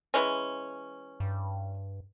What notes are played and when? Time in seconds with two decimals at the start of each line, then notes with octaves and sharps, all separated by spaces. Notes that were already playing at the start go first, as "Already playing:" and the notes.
0.14 E3 G#3 C#4
1.20 G2